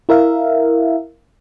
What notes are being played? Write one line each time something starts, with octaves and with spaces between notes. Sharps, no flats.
E4 A#4 E5 F5